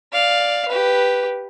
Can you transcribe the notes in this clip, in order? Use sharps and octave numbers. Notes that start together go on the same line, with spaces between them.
D5 F5
G4 B4